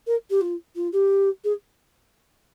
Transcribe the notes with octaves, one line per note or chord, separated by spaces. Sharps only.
A#4
G4
F4
F4
G4
G#4